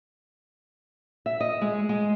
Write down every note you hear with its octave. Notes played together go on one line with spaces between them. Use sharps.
E5
D#5
G#3
G#3